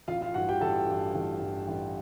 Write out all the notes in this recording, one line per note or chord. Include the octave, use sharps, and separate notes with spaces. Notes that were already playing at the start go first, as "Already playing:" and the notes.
A1 F4 F5
F4 F5
G2 E3 F#4 F#5
G4 G5
A1 A4 A5
G2 E3
A1
G2 E3
A1